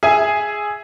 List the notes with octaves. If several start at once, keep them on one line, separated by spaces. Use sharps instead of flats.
G#4 E5 G#5